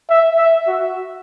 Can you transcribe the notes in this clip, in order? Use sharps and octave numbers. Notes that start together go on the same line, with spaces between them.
E5
E5
F#4